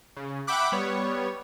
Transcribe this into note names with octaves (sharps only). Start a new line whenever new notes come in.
C#3
E5 F#5 G5 B5 D6 F#6
G3 B3 C#5